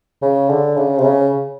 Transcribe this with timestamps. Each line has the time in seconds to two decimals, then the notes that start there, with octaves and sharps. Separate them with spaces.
0.22 C#3
0.49 D3
0.77 C#3
0.98 C3
1.04 C#3